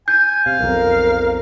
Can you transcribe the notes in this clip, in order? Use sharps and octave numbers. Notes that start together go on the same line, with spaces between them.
G#5 G6
C3 F5
B1 F2 A#4